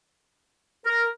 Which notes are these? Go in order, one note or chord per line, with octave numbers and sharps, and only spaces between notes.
A#4